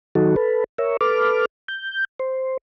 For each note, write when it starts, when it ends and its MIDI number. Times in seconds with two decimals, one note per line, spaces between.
0.15 0.36 51
0.15 0.36 54
0.15 0.36 63
0.15 0.36 66
0.15 0.36 69
0.36 0.64 69
0.36 0.64 71
0.78 0.97 70
0.78 0.97 73
0.78 0.97 76
1.01 1.45 69
1.01 1.45 71
1.01 1.45 86
1.01 1.45 89
1.68 2.05 91
2.20 2.57 72